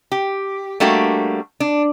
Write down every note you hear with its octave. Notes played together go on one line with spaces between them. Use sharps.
G4
G3 A3 A#3 D4 F#4 G4
D4